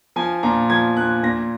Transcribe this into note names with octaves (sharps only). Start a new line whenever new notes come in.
F3 G#5
A#2 A#5
F3 G#6
A#2 F#6
A#2 A#6